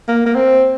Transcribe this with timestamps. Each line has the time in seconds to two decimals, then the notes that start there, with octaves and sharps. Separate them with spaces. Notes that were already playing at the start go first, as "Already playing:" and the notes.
0.08 A#3
0.26 A#3
0.35 C4